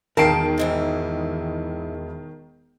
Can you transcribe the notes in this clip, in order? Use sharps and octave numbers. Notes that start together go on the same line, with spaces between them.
E1 D#3 A#4 F5 G5 A5 C7 D7
G#2 E3 E4